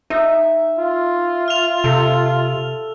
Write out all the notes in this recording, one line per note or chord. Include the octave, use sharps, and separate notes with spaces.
D#4 E5
F4
F6 F7
C3 A4